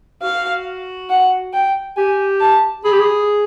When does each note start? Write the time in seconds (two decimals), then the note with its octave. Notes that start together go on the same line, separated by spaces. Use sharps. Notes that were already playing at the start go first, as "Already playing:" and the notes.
0.22 F#4 F5
1.10 F#5
1.54 G5
1.97 G4 G#5
2.41 A5
2.84 G#4 B5
2.92 G4
2.99 G#4